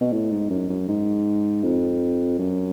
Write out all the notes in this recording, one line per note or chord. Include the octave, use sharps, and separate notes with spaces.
B2
A2
G#2
F#2
F#2
G#2
F2
F#2